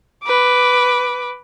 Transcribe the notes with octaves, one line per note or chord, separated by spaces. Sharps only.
B4 D6